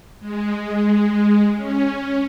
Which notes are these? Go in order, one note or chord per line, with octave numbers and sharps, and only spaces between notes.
G#3
C#4